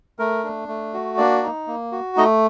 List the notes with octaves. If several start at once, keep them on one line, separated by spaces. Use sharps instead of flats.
A3 A#4
D4
A3
F#4
A#3 D4 D5
D#4
A#3
F#4
A3 D#4 D#5